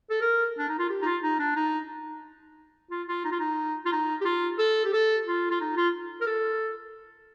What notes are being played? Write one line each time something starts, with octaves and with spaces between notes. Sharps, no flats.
A4
A#4
D4
D#4
F4
G4
D#4
F4
D#4
D4
D#4
F4
F4
D#4
F4
D#4
F4
D#4
G4
F4
A4
G4
A4
F4
F4
D#4
F4
A#4
A4